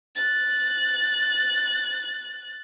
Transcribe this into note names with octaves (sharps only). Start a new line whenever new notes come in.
F#6 A6